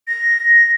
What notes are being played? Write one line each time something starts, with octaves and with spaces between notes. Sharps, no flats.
A#6